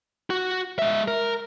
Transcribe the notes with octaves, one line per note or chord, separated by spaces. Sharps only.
F#4
G#3 E5
A#4